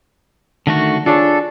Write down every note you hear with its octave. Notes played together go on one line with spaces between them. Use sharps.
D3 D#3 A3 F#4
D4 F4 G#4 A4 C#5